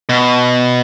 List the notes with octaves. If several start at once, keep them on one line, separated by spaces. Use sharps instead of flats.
B2